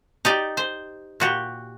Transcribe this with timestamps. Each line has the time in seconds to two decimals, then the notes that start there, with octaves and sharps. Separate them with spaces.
0.25 D#4 G4 D5
0.57 C5
1.20 A#2 F#4 G4